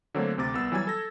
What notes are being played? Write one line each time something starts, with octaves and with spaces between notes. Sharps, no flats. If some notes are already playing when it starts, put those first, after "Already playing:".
D3 F#3 A3 A#3 C4
D2 C3 C4 D6 A6 A#6
C2 B3 E6
E3 F#3 G3 G#5 E6 G#6
A4 A#6